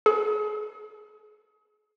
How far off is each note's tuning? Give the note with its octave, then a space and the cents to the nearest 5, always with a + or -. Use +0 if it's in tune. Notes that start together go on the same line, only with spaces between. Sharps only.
G#4 +40